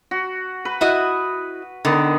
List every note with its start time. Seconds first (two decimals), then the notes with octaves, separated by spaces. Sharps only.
0.11 F#4
0.65 B4
0.81 E4 F#4 D#5
1.85 D3 D#3 B3